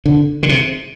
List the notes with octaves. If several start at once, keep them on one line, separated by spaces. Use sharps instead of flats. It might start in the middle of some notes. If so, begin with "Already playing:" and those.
D3
D3
C3